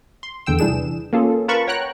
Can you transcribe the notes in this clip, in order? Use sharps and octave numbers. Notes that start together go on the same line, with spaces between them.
C6
E2 D3 G5 E6
C2 E3 D4 G#4 E7
A#3 C#4 F4 G#4 A4
F4 A#4 B4 A5 B5 C#6
C#5 F#5 G5 A#5 F#6